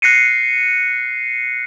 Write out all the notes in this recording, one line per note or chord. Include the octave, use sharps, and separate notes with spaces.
F#6 A#6 C7 C#7 D#7